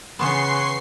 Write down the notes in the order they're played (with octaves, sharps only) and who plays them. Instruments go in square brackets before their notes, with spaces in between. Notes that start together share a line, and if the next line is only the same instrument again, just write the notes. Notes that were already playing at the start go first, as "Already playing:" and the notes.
[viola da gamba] C#3 [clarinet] E3 [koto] B3 [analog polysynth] C6 C#6 C7